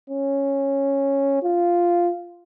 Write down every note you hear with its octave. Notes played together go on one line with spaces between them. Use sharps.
C#4
F4